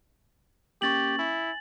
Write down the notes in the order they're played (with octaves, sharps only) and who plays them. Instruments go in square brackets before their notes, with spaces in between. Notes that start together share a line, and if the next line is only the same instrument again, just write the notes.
[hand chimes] A#3 C#4 C#6 [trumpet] G4 [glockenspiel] A6 F#7
[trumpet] E4 [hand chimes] G#5